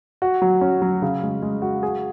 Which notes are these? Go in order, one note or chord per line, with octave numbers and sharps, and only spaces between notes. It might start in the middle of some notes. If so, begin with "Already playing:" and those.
F#4
F#3
C#4
F#3
C#3
G#3
G#3
F#4
G#4